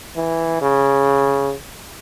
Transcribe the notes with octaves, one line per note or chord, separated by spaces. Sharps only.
E3
C#3